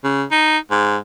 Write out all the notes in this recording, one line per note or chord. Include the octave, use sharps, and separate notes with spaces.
C#3
D#4
G#2